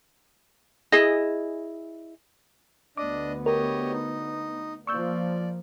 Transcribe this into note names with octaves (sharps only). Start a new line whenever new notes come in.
E4 G#4 D#5
D2 B3 D4 D#5 D6
G4 A#4 C#5 D#5
D#4
F3 A#3 D5 C#6 E6 G6